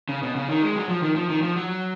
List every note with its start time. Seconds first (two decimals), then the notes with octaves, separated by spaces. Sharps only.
0.09 C#3
0.23 B2
0.36 C#3
0.49 D#3
0.63 G#3
0.76 F#3
0.89 F3
1.03 D#3
1.16 F3
1.29 D#3
1.42 F3
1.56 F#3